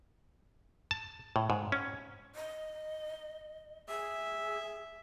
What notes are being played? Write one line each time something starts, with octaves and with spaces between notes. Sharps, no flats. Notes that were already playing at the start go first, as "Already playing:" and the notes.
A5
A2
G#2
C#4
D#5
G#4 E5